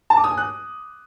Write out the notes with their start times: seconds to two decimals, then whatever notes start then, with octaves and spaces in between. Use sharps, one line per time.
0.10 A5
0.17 D6
0.24 D#6
0.31 G#5
0.37 F#6